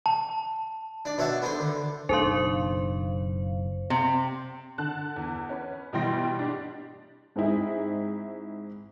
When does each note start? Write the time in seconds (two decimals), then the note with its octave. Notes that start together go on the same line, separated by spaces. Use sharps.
0.06 A5
1.05 D4 D5
1.18 B2 D4 C#5 E5 F#5 A5
1.42 B3 D4 A4 C5
1.60 D3
2.09 F#1 B2 D4 D#4 A4 C5 F5 C6
3.90 C3
4.78 D3 A5 F#6
5.16 E2
5.49 C#4 B4
5.93 B2 E3 G3 G5 C6 A#6
6.39 D4 G4
7.36 G#2 C4 D#4 E4 G#4